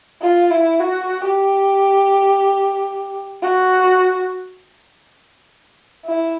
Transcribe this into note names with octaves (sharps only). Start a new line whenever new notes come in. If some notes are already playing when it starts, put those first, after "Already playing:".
F4
E4
F#4
G4
F#4
E4